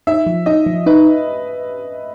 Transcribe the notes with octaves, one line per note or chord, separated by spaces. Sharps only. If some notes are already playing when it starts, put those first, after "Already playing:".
D#4 E5
F3
D#4 D#5
F3
D#4 B4